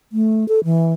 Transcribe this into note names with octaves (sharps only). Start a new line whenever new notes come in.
A3
A4
E3